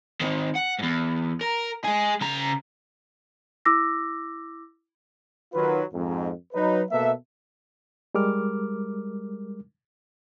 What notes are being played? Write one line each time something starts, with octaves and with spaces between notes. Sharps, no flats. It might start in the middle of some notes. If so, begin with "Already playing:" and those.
D#3 C4
F#5
E2 G#2
A#4
G#3 G#4
C#3 A#5
E4 D6 E6 A#6
D#3 F#3 F4 B4
F2 G#2
F#3 D#4 B4
B2 A#3 A4 B4 E5
G3 G#3 A#4 D6 F6